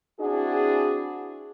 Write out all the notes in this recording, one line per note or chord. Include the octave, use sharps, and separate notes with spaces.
C4 D4 E4 F#4 G#4